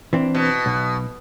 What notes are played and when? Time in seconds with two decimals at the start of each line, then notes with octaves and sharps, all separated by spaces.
0.13 E3 C4 D4
0.35 B2
0.66 B1